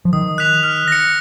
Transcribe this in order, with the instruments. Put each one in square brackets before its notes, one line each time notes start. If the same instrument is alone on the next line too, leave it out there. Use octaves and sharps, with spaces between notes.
[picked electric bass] F3
[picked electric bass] D#3 [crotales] D#6
[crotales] F#6 B6 F7
F6
A#6 C#7